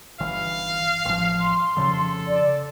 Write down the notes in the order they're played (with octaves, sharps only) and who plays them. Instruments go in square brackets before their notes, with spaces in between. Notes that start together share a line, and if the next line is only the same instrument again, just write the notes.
[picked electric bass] G1 E3 [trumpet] F5
[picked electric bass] A1 F3
[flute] C6
[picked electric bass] F1 C#3 F3 [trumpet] A4
[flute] D5